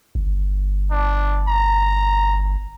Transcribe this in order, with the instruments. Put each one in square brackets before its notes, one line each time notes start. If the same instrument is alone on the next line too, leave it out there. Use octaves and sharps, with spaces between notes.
[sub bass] G1
[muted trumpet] D4
A#5